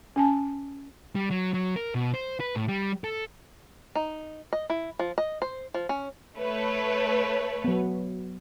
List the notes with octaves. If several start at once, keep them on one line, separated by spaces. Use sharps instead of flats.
C#4 G#5 A5
G3
F#3
F#3
A#4
B2
C5
B4
A2
G3
A4
D#4
D#5
E4
F3
D#5
C5
F3
C#4
A3 B4 C#5
F#3 B3